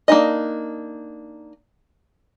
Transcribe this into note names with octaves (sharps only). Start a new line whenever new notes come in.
A#3 D4 D#4 D#5